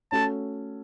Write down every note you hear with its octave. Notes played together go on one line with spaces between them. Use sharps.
A3 C#4 F#4 A4 A5